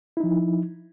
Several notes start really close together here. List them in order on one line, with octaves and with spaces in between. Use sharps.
E4 D#4 F3